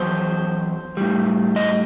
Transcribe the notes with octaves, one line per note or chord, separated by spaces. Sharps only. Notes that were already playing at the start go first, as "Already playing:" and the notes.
Already playing: E2 F#3 C5
A2 G3
D#5